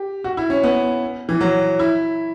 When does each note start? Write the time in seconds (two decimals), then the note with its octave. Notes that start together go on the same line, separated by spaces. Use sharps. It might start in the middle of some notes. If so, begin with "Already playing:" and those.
Already playing: G4
0.24 F#4
0.37 E4
0.50 C#4
0.63 B3
1.29 E3
1.41 F#3
1.79 E4